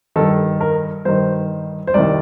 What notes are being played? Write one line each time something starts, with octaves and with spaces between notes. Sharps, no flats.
G2 D#3 A4
A#4
G2 D#3 C5
C5
C2 C3 D#3 D5